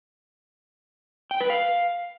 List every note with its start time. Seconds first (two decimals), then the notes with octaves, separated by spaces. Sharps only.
1.31 G5
1.40 B4
1.50 F5